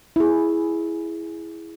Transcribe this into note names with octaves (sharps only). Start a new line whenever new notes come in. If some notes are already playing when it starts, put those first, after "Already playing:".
E4 G#4